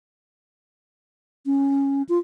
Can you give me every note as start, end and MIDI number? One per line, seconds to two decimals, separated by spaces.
1.46 2.02 61
2.09 2.19 65